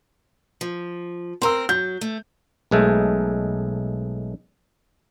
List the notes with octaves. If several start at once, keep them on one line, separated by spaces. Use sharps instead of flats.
F3
C4 A#4 C6 E6
F#3 G6
A3
B1 G#3 A3